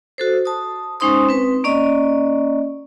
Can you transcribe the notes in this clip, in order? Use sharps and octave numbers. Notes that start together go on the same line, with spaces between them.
F#4 A4 C5
A5 D#6
G#3 C#4 D#4 C5 C6 D#6
C4 B4
A#3 C#4 D5 D#5